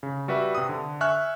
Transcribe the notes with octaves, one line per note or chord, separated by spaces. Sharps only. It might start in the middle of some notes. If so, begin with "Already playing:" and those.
C#3
G3 F#4 B4 E5
C3 D#6
D3
E5 G#5 C#6 F6 F#6